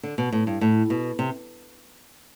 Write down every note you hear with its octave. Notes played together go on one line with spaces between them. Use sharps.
D3
B2
A2
G2
A2
B2
C3